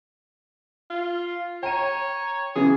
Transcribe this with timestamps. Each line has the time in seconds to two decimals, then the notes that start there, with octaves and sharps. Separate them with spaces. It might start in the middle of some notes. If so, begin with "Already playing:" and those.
0.90 F4
1.63 C#5 G5 A#5 D#7
2.56 F#2 C#3 E3 G#4